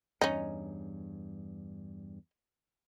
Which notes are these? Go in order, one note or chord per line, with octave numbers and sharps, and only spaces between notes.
E2 G2 C#4 D#4